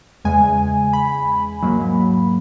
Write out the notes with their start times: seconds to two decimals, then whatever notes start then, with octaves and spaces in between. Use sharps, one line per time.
0.25 E2 C#3 G#3 G#5
0.93 B5
1.63 G#2 F#3 A#3